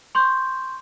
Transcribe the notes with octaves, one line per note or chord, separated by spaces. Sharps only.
C6 C#6 G6